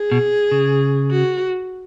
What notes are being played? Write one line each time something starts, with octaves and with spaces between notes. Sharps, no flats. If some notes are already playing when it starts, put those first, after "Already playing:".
Already playing: G#4
B2
C#3
F#4